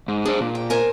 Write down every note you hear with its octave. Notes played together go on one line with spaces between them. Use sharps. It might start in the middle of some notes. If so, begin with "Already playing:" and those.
G#2
D4 G#4 C5
A#2
G5
A#4 C5 G#5